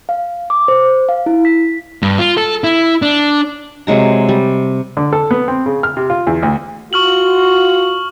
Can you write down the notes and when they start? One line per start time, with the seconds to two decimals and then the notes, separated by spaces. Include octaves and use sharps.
0.09 F5
0.50 D6
0.68 C5
1.09 F5
1.26 E4
1.45 B6
2.02 G2
2.19 F4
2.37 A4
2.64 E4
3.02 D4
3.87 C3 F#3 G#3 A#5
4.29 G3
4.97 D3
5.13 A4
5.31 B3
5.48 C4
5.66 C#3
5.83 F6
5.97 C3
6.10 F4
6.27 E2
6.43 D2
6.93 F4 F#4 C#6 F6 F#7